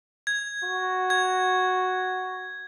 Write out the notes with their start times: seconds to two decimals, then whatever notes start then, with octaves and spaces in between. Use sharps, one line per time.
0.27 G#6
0.64 F#4
1.10 G#6